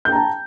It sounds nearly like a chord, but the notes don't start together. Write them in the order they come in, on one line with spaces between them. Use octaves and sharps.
G6 G5 A#5 A5